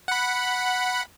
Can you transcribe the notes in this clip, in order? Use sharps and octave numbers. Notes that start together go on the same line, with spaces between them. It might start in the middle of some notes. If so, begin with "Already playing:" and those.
F#5 B5